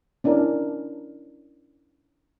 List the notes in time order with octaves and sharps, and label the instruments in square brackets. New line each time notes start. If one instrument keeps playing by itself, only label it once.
[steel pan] C#4 D4 E4 A#4